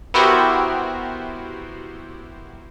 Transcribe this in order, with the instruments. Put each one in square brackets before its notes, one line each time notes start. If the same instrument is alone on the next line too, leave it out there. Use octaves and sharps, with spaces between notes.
[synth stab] B3 E4 F#4 G4 A#4 C5